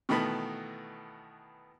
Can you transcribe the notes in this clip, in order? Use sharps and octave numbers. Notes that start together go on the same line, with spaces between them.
B2 D#3 E3 A3 B3 B5